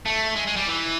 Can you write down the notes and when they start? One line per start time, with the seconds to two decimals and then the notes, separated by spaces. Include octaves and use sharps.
0.06 A3
0.36 G#3
0.47 G#3
0.56 G3
0.67 E3